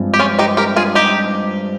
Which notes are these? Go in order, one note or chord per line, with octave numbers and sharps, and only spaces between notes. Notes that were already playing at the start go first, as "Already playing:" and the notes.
Already playing: G2 F3 G#3 C4
G4
C#4 F4
D#4 G4
G4 A#4
F4 G#4
D#4 G4